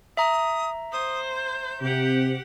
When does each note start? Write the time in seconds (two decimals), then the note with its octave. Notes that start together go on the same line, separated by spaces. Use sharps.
0.17 E5 A#5 D#6
0.93 C5 D#6
1.35 G6
1.82 C3 G4 F#5